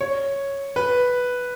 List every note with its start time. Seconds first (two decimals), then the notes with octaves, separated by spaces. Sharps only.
0.01 C#5
0.76 B4